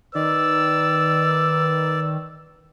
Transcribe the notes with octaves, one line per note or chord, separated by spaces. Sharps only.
D#3 B4 D5 E6